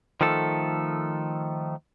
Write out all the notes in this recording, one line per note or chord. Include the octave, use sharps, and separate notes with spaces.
D#3 F3 A3 A4